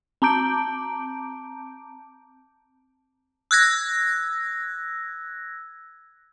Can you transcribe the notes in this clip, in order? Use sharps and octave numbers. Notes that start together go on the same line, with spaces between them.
C4 A5 A#5 D6 G6 D7
E6 F#6 G#6 A#6